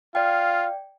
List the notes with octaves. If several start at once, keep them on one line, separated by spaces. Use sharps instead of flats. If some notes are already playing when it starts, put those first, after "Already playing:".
F4 D5 F5 G5